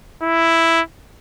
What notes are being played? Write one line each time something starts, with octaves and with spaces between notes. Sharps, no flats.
E4